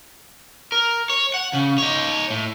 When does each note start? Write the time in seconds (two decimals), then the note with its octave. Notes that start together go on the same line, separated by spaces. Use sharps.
0.72 A#4
1.10 C#5
1.34 F#5
1.53 C#3
1.78 D#4 C#5
2.30 A2